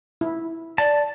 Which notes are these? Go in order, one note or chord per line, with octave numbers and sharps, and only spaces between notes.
E4
D5 A5